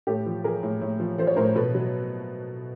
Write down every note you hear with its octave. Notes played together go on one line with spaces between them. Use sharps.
A2 G4 A4
F3
F3 G#4 A#4
A2
A2
F3
F3 C5
C#5
A2 A#4 C5
B2 A4 B4
F#3